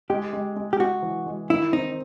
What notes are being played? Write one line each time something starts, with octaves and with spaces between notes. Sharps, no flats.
G#3 G4
G#3
G#3
G4
G#3 F#4
E3
G#3
D#3 E4
C4 D#4